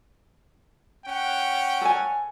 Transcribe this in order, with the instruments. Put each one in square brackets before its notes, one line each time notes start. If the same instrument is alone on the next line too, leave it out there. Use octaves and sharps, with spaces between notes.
[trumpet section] C#4 F#5 G5
[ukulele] A4 G#5